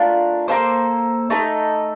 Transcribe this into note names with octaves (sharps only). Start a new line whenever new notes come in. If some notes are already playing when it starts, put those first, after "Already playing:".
Already playing: A3 D4 F4 A#4
A#3 F4 A4 C5
A3 D#4 A4